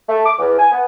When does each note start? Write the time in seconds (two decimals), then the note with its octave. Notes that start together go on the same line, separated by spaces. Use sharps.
0.08 A3
0.26 D6
0.39 E2
0.58 G#5
0.72 B3